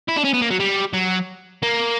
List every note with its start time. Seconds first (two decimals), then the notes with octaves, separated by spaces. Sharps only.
0.09 E4
0.17 D4
0.25 C#4
0.34 B3
0.42 A#3
0.51 F#3
0.60 G3
0.94 F#3
1.63 A#3